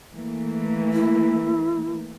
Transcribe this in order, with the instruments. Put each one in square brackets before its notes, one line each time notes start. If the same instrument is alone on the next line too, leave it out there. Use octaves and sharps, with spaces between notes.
[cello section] E3 A3 A#3
[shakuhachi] E4